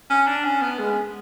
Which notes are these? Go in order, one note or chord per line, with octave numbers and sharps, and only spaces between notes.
C#4
D4
C#4
B3
G#3